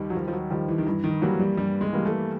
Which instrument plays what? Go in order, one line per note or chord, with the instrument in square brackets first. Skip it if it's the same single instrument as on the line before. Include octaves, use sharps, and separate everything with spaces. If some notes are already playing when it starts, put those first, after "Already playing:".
Already playing: [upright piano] D#2 D#3 G3
[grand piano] F#3
[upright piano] D#2 [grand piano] F3
[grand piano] F3
F#3
[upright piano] D#3 G3 [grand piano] F3
[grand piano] E3
D#3
[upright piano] G2 [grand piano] E3
[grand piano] D#3
[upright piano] E3 G3 A#3 [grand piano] F#3
[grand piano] G3
[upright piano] G2 [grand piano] G3
[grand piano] G#3
[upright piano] E3 G3 A#3
[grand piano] A3